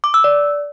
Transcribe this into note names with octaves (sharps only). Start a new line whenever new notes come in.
D6
E6
D5